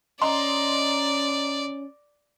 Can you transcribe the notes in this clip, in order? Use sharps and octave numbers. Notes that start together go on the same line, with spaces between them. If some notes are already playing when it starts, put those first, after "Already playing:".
C#4 D5 D#5 A#5 C6